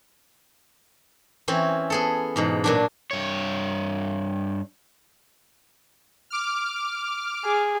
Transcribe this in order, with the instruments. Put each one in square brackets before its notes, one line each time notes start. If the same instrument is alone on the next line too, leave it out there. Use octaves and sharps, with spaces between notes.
[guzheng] E3 C4 C#4
B3 G#4 A4
E2 G#2 B2
A#2 F#3 D4
[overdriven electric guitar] G2 C#5
[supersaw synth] D6 F6
[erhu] G#4